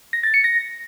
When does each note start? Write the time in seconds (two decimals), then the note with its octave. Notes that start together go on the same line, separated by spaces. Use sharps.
0.13 A#6
0.23 A6
0.34 C#7
0.44 A#6